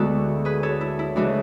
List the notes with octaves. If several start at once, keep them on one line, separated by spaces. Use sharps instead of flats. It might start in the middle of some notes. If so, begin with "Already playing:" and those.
Already playing: D2 D3 G#3 B3 E4 F#4 A4
G#4 B4
A4 C#5
E4
E4
C#3 E3 G#3 D4 F#4